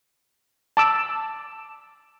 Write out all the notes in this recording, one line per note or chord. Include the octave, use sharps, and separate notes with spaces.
A5 D6 E6